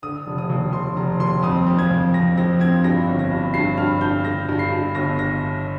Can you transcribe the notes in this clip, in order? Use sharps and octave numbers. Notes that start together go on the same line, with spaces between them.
D3 D#6
F1
D#6
D#2
D#2 C6
F1 A#5
D#2 C6
F2 D#6
F3
G#6
F2
F2 A#6
F3 A#6
C4 G#6
G2 A#6
G1
A#6
G2
G2 C7
G2 F6
G2 G6
D3 A#6
G2
C7
G2
G1 A#6
A#6